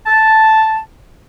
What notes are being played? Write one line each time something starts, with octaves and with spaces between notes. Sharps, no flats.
A5